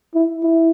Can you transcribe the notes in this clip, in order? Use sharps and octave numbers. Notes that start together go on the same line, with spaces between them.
E4
E4